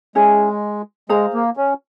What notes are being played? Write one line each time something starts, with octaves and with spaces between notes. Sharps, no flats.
G#3 C#4 E4 G#4
G#3 G#4 C5 F5 A#5
A#3
C#4